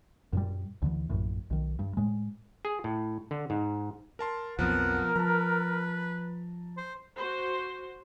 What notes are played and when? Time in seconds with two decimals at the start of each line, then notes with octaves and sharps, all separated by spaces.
0.33 F#2 A#2 G3
0.82 D2 D3 E3
1.10 A#1 F#2 A2
1.50 B1 D#3
1.79 G2
1.97 A2 G#3
2.65 G#4
2.84 A2
3.31 D3
3.50 G#2
4.19 A#4 A5 C6
4.59 B1 F2 F3 B3 A#4 F#5
5.16 F3 B4 A5 A#5
6.77 C5
7.15 F#4 C5